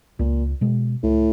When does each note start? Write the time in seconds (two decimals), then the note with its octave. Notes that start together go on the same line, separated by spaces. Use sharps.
0.19 C#2 A#2
0.61 B2 G#3
1.03 C#2 A2